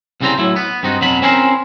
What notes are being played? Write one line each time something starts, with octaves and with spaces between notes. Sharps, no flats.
C2 C#3 G3 C4 G5 A#5
A2 F#3 E4
B3
G2 C4 D#4 F#4
F2 B2 F#3 B5
C4 C#4 E4 A#4 C5